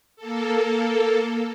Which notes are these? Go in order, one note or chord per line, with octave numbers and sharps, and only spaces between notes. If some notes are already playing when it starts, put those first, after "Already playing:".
A#3 A4